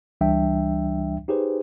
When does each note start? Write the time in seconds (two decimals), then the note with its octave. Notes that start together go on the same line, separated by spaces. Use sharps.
0.21 C#2 E3 G3 D4 E5 G5
1.28 D#4 G4 G#4 B4 C5